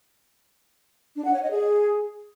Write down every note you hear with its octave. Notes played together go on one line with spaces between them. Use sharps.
D4
F#5
C#5
D#5
G#4